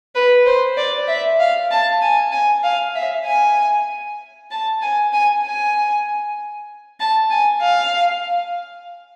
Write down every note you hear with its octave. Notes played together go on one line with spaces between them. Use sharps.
B4
C5
D5
E5
F5
A5
G#5
G#5
F5
E5
G#5
A5
G#5
G#5
G#5
A5
G#5
F5